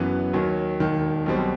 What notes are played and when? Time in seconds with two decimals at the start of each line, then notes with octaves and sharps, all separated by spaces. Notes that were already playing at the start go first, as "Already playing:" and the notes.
Already playing: F#1 F#2 E3 B3 F#4
0.33 D#2 D#3 F#3
0.80 E1 D#2 D#3
1.26 B1 B2 G3 C4